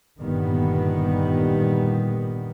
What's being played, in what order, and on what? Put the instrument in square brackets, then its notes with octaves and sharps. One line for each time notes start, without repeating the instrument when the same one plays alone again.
[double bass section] G1 G2 A#2 D#3 G3 B3